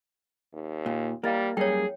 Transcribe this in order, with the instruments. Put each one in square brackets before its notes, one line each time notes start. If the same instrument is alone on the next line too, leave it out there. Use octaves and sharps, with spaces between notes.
[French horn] D#2
[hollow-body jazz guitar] A#2
[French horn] G3 [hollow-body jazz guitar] A#3 [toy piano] E4 D#5 F5
[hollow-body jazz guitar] F#2 G3 A#3 [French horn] G#4 [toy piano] C#5 G5